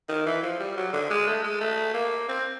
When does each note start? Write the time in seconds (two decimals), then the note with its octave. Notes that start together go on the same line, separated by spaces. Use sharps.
0.09 D#3
0.26 E3
0.43 F3
0.60 G3
0.77 F#3
0.93 D3
1.10 G#3
1.27 A3
1.44 G#3
1.60 A3
1.94 A#3
2.29 C4